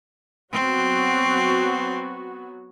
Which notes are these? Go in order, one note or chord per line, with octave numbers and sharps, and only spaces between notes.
F#3 B3 C4 F#4